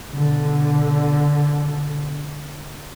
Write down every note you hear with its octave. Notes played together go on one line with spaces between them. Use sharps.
B2 D3